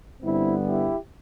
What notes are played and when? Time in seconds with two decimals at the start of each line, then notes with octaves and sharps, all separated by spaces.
0.22 G2 D3 G3 B3 C4 E4
0.66 E4 G4